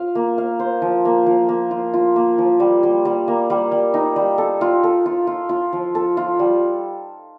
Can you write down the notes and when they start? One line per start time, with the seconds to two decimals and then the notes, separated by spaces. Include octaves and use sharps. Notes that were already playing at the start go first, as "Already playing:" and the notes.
Already playing: F4 F5
0.15 A#3
0.38 F5
0.59 C5
0.82 F3
1.05 A#3
1.26 F3
1.49 A#3
1.71 F4
1.94 F4
2.16 A#3
2.38 F3
2.60 G3
2.83 G3
3.05 G3
3.28 A#3
3.50 G3
3.72 G3
3.94 D#4
4.16 G3
4.38 A4
4.61 F4
4.83 A4
5.06 F4
5.27 F4
5.49 F4
5.73 F3
5.95 A4
6.17 F4
6.39 G3